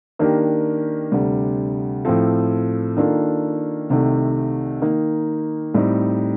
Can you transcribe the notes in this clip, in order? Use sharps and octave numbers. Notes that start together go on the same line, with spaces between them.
D#3 A#3 D4 G4 A#4
D2 C3 G3
A2 F3 C4 F4 A4
D#3 A#3 D4 F4 A4
C2 C3 D#3 A3
D#3 A#3 D#4
A2 G3 C4 D#4